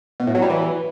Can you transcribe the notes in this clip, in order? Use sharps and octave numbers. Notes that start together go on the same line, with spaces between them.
B2
A2
F#3
G3
E3